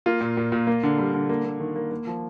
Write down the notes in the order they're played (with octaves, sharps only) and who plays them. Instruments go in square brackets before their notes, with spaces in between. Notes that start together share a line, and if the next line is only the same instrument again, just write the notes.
[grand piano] A#3 F4
A#2
A#2
A#2
A#3
D3
G3
D3
A#3
A#3
D#3
A#3
A#3
F3